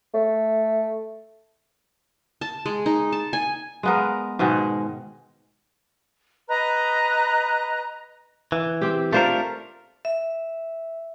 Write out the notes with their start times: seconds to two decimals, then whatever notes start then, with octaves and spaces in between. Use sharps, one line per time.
0.14 A3
2.41 A5
2.66 G#3
2.86 D#4
3.12 A5
3.33 G#5
3.83 G#3 B3 A#4
4.39 G#2 B2 D#3 G#3
6.49 B4 D#5 A#5 F#6
8.52 E3
8.81 C4 G4
9.13 A3 D4 F4 A#4 C5
10.05 E5